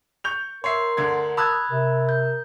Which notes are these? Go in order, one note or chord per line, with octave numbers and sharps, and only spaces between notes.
C#6 G6 F7
A#4 C#5 E5 C6 C7
D2 D3 G#6
A5 B5 D#6 E6 F#6 G#6
C3 A#4
G6